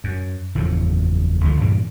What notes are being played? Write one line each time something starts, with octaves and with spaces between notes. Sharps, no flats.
F#2
F#1 E2 A2 F3
C#2 D3 F3
G2 A#2 E3 G3